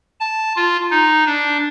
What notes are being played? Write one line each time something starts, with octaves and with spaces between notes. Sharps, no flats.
A5
F4
D#4
D4